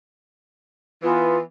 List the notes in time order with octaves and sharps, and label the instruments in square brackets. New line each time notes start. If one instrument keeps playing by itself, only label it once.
[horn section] E3 B3 [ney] F4